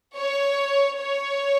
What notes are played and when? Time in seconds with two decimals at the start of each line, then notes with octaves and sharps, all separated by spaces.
0.18 C#5
0.98 C#5